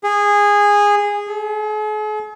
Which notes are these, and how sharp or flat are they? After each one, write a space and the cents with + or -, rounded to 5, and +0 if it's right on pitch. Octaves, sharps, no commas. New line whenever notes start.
G#4 -15
G#4 +45